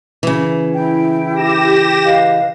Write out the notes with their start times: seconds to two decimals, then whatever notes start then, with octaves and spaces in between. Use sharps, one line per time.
0.23 C#3 E3
0.75 E4 G5
1.33 G4 A#6 E7
2.05 B4 D#5 F5